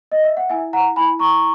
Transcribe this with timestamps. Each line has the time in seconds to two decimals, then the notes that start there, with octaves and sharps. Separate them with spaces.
0.12 D#5
0.24 E5
0.37 F#5
0.49 E4 E5 G#5
0.73 F#5 A#5
0.96 E4 G#5 B5
1.19 A#5 C#6